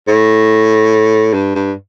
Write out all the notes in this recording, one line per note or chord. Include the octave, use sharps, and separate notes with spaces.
A2
G2
G2